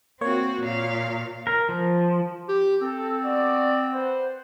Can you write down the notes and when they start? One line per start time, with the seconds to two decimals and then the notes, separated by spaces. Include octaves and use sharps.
0.21 A#3 C4 F#4 C#5
0.62 A#2 F5
1.47 A#4
1.69 F3
2.48 G4
2.82 C4 A4
3.24 B3 F#4 D5
3.93 B4 C5 F#5